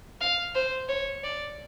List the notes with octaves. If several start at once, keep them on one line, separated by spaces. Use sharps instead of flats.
F5
C5
C#5
D5